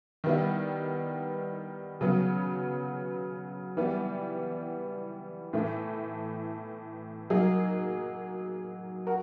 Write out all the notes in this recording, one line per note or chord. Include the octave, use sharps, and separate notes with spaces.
D#3 G3 B3 E4
C#3 F#3 B3
E3 G3 B3
A2 E3 A3
F#3 A#3 D#4 G#4
F#4 A#4